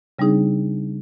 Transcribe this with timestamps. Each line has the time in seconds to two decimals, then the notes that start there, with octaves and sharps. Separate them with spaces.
0.19 C#3 G3 C4 D4 D#4 G#4